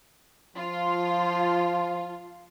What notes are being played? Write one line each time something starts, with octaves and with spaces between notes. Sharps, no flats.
F3 F4